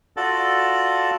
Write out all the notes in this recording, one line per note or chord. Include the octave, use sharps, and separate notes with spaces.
F4 F#4 A4 D5 A5